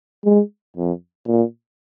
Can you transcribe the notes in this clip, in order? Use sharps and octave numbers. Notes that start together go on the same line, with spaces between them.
G#3
F2
A#2